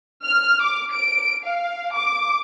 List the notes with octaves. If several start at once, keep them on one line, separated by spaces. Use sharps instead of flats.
F6
D6
D7
F5
D6